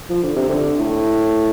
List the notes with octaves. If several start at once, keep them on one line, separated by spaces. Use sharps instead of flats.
F3
D3
C3
D3
A2